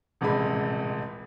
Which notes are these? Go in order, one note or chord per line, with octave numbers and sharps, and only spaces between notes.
D#1 A1 C3 G#3 B5